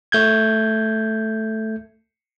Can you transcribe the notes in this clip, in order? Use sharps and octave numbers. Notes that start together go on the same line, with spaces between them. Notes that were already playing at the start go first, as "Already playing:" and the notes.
A3 G6 G#6